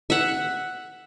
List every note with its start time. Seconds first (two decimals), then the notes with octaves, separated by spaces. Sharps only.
0.10 E5 F#5